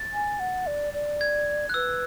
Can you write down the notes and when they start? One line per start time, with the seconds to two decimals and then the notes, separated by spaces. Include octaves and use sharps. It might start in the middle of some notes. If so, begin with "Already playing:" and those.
Already playing: A6
0.14 G#5
0.40 F#5
0.67 D5
0.94 D5
1.21 G#6
1.69 F#6
1.74 B4 E6